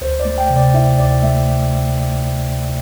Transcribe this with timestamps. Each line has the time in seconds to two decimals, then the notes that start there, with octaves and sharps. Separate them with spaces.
0.01 D2 C5
0.20 D5
0.25 A3
0.38 G5
0.50 C3
0.57 D5
0.74 E4 E5
0.99 D2 D5
1.22 A3 E5